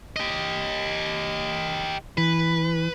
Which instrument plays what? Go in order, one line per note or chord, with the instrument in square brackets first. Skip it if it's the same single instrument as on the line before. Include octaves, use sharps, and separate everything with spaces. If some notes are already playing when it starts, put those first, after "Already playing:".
[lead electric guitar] G4 D#5
[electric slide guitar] E3 [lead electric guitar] B4